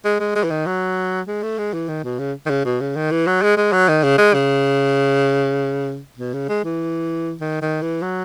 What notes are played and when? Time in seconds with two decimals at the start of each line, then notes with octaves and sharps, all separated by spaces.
0.05 G#3
0.20 G#3
0.35 G#3
0.44 E3
0.50 D#3
0.66 F#3
1.27 G#3
1.43 A3
1.58 G#3
1.74 E3
1.89 D#3
2.04 B2
2.19 C#3
2.46 D#3
2.50 C#3
2.65 B2
2.81 C#3
2.96 D#3
3.11 E3
3.27 F#3
3.42 G#3
3.57 G#3
3.73 F#3
3.89 D#3
4.04 C#3
4.18 G#3
4.34 C#3
6.18 B2
6.34 C#3
6.49 G#3
6.65 E3
7.41 D#3
7.62 D#3
7.82 E3
8.02 F#3